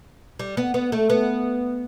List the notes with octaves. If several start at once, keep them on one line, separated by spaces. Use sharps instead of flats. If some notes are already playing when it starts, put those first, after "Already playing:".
G3
B3
B3
A3
B3